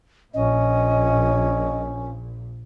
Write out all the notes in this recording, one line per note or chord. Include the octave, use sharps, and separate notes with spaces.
A#1 A#2 C#4 D#5